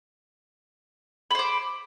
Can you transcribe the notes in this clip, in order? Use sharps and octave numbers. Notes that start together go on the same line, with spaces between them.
C5 B5 D6